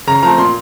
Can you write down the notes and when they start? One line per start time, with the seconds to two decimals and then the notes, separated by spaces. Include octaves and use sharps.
0.07 C#3 A#5
0.23 F3 A3 C4 A#5
0.38 A#2 C6